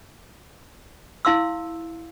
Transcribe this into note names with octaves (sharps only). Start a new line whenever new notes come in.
E4 F5 C6 E6